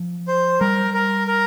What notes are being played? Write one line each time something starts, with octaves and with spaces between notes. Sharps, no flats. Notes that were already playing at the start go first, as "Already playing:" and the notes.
Already playing: F3
C5
G3 A#4
A#4
A#4